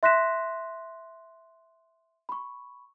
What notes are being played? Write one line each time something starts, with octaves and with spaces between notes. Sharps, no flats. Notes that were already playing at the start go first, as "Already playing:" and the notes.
E5 C6 F#6 A#6 B6 E7
B5 C#6